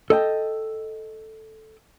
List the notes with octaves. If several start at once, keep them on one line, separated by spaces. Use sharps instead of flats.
A4 D#5 G5